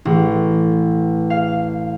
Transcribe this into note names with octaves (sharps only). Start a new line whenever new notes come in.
A1
F5